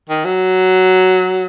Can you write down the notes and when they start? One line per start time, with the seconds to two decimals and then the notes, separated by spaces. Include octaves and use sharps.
0.09 D#3
0.25 F#3